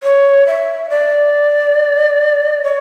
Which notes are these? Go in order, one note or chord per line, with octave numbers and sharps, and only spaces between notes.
C#5
E5
D5
C#5